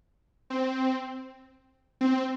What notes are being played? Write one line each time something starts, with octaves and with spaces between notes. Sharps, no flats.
C4
C4